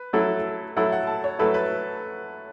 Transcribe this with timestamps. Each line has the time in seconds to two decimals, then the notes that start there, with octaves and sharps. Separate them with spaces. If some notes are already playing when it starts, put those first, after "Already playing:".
Already playing: B4
0.13 F#3 A3 E4 A4
0.76 F#3 A3 E4 A4 F#5
0.92 F#5
1.07 A5
1.24 C#5
1.39 F#3 A3 E4 A4 B4
1.54 B4